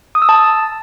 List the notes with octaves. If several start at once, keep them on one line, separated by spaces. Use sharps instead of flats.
D#6
E6
A5